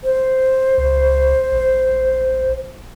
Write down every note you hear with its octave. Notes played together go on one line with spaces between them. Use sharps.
C5
C#2
A#1